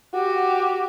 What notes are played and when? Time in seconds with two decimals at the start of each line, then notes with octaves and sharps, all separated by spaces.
0.14 F#4 G4